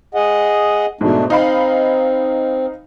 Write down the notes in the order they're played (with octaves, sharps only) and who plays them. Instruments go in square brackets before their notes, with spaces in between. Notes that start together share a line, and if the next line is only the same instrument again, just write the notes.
[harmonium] G#4 D#5 F#5
[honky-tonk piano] G#2 B2 [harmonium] A3 D4
[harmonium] C4 [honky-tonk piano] D#4 F5 B5